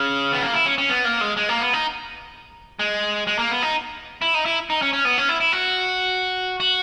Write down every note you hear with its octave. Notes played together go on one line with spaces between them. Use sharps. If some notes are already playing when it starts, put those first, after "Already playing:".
Already playing: C#3
B3
A#3
E4
C#4
C#4
B3
A#3
G#3
G#3
A#3
B3
D#4
G#3
G#3
A#3
B3
D#4
E4
D#4
E4
D#4
C#4
C#4
B3
C#4
E4
E4
F#4
F#4